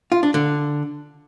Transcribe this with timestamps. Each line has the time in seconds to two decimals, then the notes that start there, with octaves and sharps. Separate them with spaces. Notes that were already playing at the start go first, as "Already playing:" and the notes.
0.12 F4
0.23 D4
0.34 D3